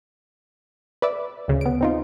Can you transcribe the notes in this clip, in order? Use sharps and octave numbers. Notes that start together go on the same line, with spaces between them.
B4 D5 E5
D2 C#3
B3 D7
C4 D#4 F4